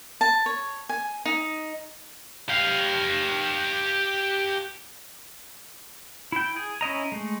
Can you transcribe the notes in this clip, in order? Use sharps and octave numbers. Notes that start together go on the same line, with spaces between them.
A5
C#5
G#5
D#4
G4 F5
E4 G5
G#4
C#4 E4 D#5 A#5
G#3 A3